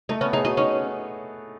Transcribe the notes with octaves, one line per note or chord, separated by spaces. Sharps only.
A3 D#4
B3 C#4
D#4 G#4
D#4 F#4
C#4 D#4